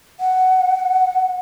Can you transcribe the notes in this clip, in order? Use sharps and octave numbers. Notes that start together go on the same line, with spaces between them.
F#5